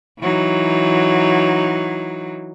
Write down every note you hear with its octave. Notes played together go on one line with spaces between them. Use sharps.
E3 F#3 D#4